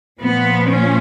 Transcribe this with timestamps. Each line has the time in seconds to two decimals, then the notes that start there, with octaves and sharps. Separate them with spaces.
0.20 A#2 F3 B3
0.68 C#4